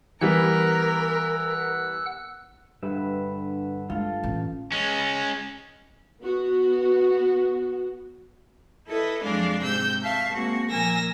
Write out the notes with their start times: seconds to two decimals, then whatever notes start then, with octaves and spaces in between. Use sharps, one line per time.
0.21 E3 G3 B3 A#4 F#5 E6 F#6
2.83 G2 D3 B4 E5
3.90 G#3 F4 A4 F5
4.23 A1 E3
4.72 G#3 C#4
6.20 B3 F#4
8.88 E4 A4 B4 D#5
9.23 F2 F#3 G#3 D4 D5 F5
9.62 G#2 C3 E6 G6
10.02 E5 F5 A5 C#6
10.34 G#3 A#3 C4 F#4
10.70 A#2 F3 A#4 G#5 E6 A#6